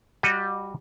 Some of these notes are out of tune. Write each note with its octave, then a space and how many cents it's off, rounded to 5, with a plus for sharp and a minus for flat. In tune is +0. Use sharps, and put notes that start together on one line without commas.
G3 +0 F#4 -20 D#5 -20